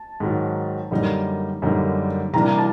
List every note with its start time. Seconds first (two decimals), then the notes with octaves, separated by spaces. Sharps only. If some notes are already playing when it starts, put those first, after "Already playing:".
Already playing: A5
0.20 G#2 D#3 F#3
0.91 F#2 D3 G3 A#3 D#4
1.62 F#2 D3 G3 A#3 D#4
2.34 C3 E3 G3 A#3 D4 A#5
2.57 A5